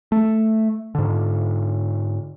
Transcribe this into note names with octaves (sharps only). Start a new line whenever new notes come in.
A3
G#2 D3